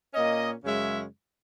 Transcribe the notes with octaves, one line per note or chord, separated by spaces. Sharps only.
A#2 A#3 C#4 D#5
F#2 C#3 G#3 C#4 E5